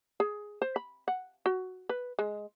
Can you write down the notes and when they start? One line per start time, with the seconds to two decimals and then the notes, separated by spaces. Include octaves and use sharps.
0.20 G#4
0.62 C5
0.76 B5
1.08 F#5
1.46 F#4
1.89 B4
2.19 G#3